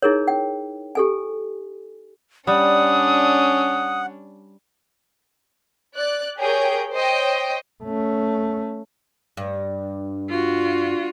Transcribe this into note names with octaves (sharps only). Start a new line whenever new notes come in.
D#4 E4 G#4 A#4 C#5
G5
G4 A4 G#5
G3 C#4 D4 F#5 D#6
D5 F#6
G4 G#4 A#4 C#5 G5
C5 C#5 D#5 G5
A3 C#4
G2
F4 F#4